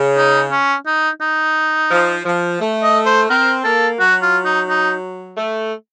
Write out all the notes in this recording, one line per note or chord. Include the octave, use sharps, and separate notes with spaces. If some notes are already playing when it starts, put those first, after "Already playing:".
Already playing: C#3
D#4
C#4
D#4
D#4
F3
F3
A3
D#5
C5
C4 A#4
A#3 A4
F#3 F#4
F4
D#4
D#4
A3